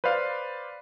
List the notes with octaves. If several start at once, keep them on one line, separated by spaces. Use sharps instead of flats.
B4 C5 D5 F5